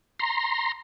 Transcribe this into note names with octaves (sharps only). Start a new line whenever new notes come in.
A#5 C6